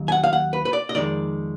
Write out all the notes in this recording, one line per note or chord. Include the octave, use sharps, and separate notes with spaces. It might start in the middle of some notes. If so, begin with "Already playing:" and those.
Already playing: D#2 D#3 F#3
G#5
F#5
F5
F#5
B4
B4
D5
D#5
F2 D#3 G#3 D5